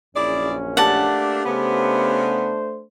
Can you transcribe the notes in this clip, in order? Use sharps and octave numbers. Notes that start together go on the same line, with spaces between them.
A#1 F#2 C#4 E4 G#4 D5
A3 A#3 D4 G4 F#5 A5
C#3 A3 B3 D4 C5